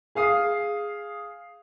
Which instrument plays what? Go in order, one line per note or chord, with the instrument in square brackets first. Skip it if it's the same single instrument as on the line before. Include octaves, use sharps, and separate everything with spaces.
[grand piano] G#4 F5 D#6 C7